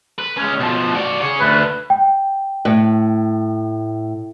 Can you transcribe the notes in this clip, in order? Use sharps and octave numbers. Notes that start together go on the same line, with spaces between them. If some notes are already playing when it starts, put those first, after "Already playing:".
B4
G#3 C#4
B2 F3
F#4 D5
G#4 C#5
D2 B4
G5
A2